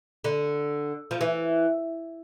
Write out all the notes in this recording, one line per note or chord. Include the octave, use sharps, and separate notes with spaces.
D3
F3
E3